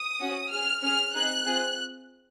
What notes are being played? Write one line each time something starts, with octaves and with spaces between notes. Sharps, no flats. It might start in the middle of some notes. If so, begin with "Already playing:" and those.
Already playing: D#6
C#4 F#4
C#4 G#4 F6
C#4 G#4 F6
C4 D#4 G#4 F#6
C4 F4 G#4